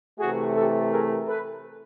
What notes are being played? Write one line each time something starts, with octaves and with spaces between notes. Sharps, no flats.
C3 E3 A3 F#4 G#4
G4 A4
G#4 A#4
A4 B4